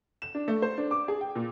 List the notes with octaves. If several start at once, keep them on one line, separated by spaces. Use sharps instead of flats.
E7
D4
A3
C5
D4
D6
G#4
G5
A#2